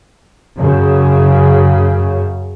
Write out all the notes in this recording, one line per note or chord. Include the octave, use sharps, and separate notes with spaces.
F#2 C#3